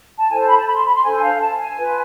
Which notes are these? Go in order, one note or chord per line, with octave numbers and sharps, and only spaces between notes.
A5
E4 A4 C5 G#5
A5
B5
A5
B5
C6
B5
C6
D4 A4 C5 G#5
F5
A5
G#5
F4 B4